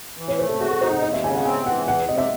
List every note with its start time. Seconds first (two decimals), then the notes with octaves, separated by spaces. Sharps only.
0.17 E3
0.28 C#5
0.39 A3 C5
0.49 A4
0.60 F#4 G#4
0.71 A4
0.81 D#4 C5
0.92 F#5
1.02 D#2 D#5
1.14 E5
1.24 C#3 G#5
1.35 F#5
1.45 C4 G#5
1.66 E3 F#5
1.87 E2 F#5
2.09 C3 D#5
2.18 E5